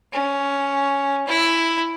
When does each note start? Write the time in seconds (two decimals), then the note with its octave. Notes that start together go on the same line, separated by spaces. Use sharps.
0.13 C#4
1.27 E4